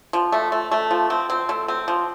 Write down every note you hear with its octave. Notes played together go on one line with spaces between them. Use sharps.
F3
A3
A3
A3
F3
C4
C4
A3
C4
F3